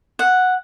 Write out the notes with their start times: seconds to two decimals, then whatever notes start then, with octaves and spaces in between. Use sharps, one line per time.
0.19 F#5